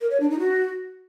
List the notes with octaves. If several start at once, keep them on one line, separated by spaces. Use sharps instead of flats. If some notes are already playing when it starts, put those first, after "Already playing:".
A#4
C#5
D4
D#4
F#4